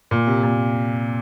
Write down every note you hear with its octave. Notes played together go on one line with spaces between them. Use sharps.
A#2
C3
A#2